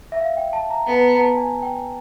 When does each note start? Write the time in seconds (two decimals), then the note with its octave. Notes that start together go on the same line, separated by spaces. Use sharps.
0.12 E5
0.21 F5
0.37 G5
0.53 A5
0.70 A#5
0.86 B3 A5
0.95 A#5
1.05 A5
1.12 A#5
1.21 A5
1.37 G#5
1.62 G5